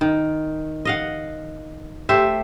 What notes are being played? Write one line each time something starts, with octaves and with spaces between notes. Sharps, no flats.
D#3
D#5 F5 F#5
A3 G4 C5 E5